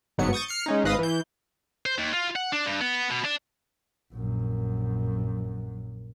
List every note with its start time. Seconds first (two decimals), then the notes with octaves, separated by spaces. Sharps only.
0.18 G1 G#2 F#3 B3 C#7
0.33 C#6 D#6 G6 A6
0.48 F6 C7 C#7
0.66 G#3 C#4 D#4
0.84 G#1 G#2 B4 D#5 F5 D#6
0.99 E3 G6
1.86 C5
1.98 D#2
2.14 F4
2.36 F#5
2.52 D4
2.66 G2
2.81 B3
3.10 B2
3.25 D4
4.13 A#1 F#2